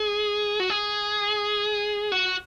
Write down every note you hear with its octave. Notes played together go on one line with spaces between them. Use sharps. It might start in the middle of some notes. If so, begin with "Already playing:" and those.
Already playing: G#4
F#4
G#4
F#4